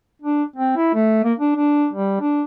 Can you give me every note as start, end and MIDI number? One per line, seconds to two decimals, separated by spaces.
0.22 0.43 62
0.56 0.76 60
0.76 0.91 64
0.94 1.21 57
1.24 1.33 58
1.39 1.54 62
1.55 1.88 62
1.93 2.18 55
2.20 2.43 62